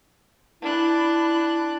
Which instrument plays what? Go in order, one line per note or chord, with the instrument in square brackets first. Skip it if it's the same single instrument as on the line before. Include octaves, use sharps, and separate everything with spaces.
[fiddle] D4 F#6 [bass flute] E4